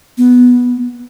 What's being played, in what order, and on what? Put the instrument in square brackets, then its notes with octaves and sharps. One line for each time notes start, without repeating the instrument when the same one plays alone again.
[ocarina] B3